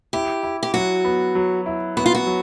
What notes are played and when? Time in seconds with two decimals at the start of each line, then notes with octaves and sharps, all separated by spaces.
0.13 E4 G4
0.43 E4
0.63 G4
0.74 F#3 F#4
1.04 B3
1.35 F#3
1.66 E4
1.97 B3 F#4
2.06 F4
2.15 F#4
2.27 F#3